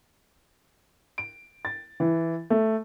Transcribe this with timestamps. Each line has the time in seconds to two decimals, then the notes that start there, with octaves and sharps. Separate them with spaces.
1.18 D7
1.65 A6
2.00 E3
2.50 A3